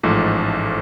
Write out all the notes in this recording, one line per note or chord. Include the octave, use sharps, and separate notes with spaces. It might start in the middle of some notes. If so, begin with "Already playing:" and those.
A1 G#2 F3 A3